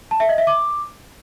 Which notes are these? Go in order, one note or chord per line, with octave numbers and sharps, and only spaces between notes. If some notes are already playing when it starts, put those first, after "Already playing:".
A5
E5
D#5
E5
D6